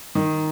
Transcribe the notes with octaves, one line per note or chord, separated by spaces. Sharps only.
D#3